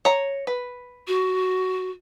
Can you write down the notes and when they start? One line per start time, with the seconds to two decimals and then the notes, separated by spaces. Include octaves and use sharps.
0.05 C#5 A#5
0.47 B4
1.08 F#4